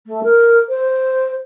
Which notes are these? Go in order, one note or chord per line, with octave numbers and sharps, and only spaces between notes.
A3
A#4
C5